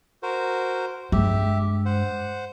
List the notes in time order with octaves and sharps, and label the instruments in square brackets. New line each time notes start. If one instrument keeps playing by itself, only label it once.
[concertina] F#4 A#4 C5
[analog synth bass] G2 [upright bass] G#3 [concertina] G4 E5
[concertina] C5 F#5